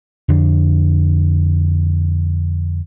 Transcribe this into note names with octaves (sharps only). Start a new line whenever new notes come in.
F2 D3 D4